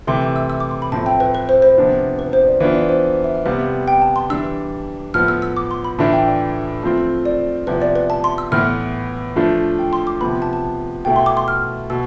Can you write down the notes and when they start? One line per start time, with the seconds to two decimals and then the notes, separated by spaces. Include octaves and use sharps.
0.07 C3 E3 A3 C6
0.22 D6
0.36 E6
0.50 E6
0.60 D6
0.71 C6
0.82 B5
0.92 A2 F3 A3 C4 E4 A5
1.06 G5
1.20 B4
1.35 B4
1.49 C5
1.62 C5
1.77 C3 F3 B3 D4 F4
2.19 B4
2.33 C5
2.47 D5
2.60 E3 B3 D4 F4 F5
2.75 D5
2.89 C5
3.03 C5
3.14 C5
3.24 E5
3.35 E5
3.46 C3 G3 B3 F5
3.88 G5
4.02 A5
4.16 C6
4.30 E3 G3 D4 E6
5.14 A2 F3 B3 F6
5.28 E6
5.42 E6
5.57 D6
5.71 C6
5.84 B5
5.99 A2 E3 A3 D4 F4 A5
6.13 G5
6.27 D5
6.83 F3 A3 C4 F4
7.25 D5
7.67 C3 F3 B3 E4 B4
7.82 D5
7.96 B4
8.10 A5
8.24 C6
8.38 E6
8.52 A2 E3 B3 F6
9.36 F3 A3 D4 F4
9.79 G5
9.93 C6
10.07 D6
10.21 C3 F3 B3 B5
10.31 B5
10.42 A5
10.53 A5
11.05 B2 A3 E4 G5
11.16 C6
11.26 D6
11.37 C6
11.48 F6
11.90 B2 E6